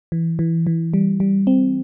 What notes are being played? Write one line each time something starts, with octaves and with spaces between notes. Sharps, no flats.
E3
E3
E3
G3
G3
C4